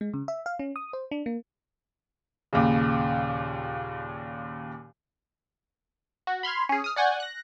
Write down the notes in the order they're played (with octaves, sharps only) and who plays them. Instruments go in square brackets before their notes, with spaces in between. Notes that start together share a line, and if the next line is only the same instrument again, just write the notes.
[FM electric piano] G#3
C#3
E5
F5
C#4
D#6
C5
D4
A#3
[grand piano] D#2 A#2 C#3
[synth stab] F#4
B5 C6 F6 G#6
C#4 G#4
D#6 F6
D5 F#5 G#5 C#6 G6
F#6 A#6